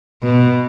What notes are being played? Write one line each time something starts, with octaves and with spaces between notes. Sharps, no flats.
B2